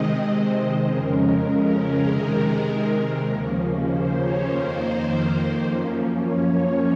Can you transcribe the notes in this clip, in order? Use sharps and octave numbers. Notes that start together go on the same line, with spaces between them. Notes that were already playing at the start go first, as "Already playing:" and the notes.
Already playing: C3 D#3 G#3 C4 D#5
C5
F2 C#3 G#3 C#4 A#4
C3 D#3 G#3 A#4
D#2 C#3 F3 A#3 C#4
C5
C#5
F2 D#3 A#3 C5
F#2 F3 A#3 C#4
C#5